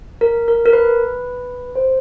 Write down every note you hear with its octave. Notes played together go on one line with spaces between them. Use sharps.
A#4
A#4
A#4
B4
C5